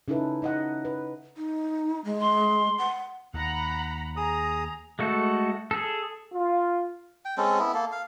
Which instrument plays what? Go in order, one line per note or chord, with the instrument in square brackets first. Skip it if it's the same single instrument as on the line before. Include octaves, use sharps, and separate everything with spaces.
[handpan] C#3 C#4 D#4 E4 A4 B4
D#4 D#5 F#5
B4
[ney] D#4
G#3
[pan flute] C6
[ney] F#5
[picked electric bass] D#2 [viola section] F#5 A#5 B5
[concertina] G#4 D#6 [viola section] A#5
[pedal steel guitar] G#3 A3 F#4 A4
G#4 A4
[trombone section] F4
[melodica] G5
G#3 C4 C#4 A4
B3 E4
A#3 A4
F5